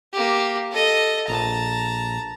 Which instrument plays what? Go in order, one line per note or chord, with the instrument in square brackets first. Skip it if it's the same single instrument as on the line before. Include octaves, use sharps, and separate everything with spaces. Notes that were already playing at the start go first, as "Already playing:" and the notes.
[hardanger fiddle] A#3 G4
A4 D#5
[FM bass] A#1 [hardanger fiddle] A5 A#5